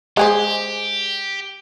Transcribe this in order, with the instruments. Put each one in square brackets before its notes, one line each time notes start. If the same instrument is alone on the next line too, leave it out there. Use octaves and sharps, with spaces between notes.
[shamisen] G#3 G#4 C5 [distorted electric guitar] G4